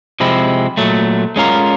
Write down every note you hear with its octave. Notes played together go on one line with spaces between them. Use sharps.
C3 F3 G#3 C4 E4
A#2 F#3 A3
G#3 C#4 F4 A#4